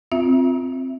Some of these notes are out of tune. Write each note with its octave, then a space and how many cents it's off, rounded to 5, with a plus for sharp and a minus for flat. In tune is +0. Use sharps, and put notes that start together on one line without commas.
C4 +0 F4 +0 E5 +0